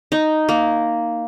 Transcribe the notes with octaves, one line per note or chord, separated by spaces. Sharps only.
D#4
A#3